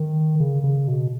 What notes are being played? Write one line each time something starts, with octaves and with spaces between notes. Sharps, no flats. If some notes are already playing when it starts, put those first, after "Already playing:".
Already playing: D#3
C#3
C#3
B2